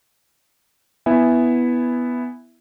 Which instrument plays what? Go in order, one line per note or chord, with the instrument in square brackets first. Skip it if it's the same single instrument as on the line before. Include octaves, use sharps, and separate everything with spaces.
[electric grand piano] B3 E4 E5 G#5